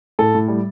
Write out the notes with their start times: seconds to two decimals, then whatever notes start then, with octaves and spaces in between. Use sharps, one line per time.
0.19 A2 A4
0.35 A2
0.48 G3